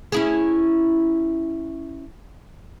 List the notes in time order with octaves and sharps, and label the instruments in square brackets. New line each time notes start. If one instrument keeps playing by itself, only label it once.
[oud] C#4 E4 G#4